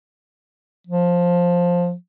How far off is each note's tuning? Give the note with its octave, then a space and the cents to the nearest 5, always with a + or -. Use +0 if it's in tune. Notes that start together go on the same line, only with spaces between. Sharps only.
F3 +10